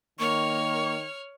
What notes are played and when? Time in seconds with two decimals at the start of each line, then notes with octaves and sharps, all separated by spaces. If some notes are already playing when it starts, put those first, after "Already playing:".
0.19 D#3 A#3 C#5 C#6 F6